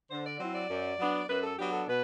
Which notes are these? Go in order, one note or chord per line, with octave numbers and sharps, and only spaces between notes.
D3 C5
D5
F#3 C4 E4 C5
D5
F#2
F#3 B3 D4
F#2 B4
A4
F#3 B3 D4 G4
A4
B2 B4